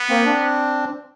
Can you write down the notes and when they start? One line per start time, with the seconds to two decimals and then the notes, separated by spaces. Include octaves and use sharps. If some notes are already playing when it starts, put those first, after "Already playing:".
Already playing: B3
0.09 A#3 C4
0.25 C4 D4